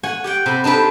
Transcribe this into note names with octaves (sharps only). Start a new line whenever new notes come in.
C#5 F#5 G#5
G4 F#5 G5
C3 B5
D4 D#4 A4 B4 C5